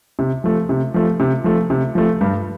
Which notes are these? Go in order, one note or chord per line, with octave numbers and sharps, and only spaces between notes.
C3
F3 A3
C3
F3 A3
C3
F3 A3
C3
F3 A3
G2